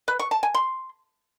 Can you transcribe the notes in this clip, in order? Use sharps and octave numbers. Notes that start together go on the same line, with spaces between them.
B4
C#6
A5
G#5
C6